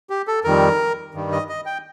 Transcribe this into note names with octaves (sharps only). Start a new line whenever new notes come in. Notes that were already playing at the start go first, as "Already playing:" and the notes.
G4
A4
F2 D#3 G3 A#4
G2 D#3 G3
D#5
D#5
G5